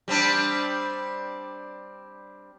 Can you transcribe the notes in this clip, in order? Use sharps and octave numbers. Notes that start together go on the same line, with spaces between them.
G3 C4 D4